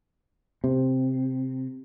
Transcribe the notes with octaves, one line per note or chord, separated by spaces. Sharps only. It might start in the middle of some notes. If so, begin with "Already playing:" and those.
C3